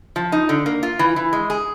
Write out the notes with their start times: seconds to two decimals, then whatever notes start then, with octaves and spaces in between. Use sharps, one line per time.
0.16 F3
0.32 D#4
0.49 D3
0.66 A#3
0.83 F4
0.99 E3
1.16 E3
1.33 G#3
1.50 G#4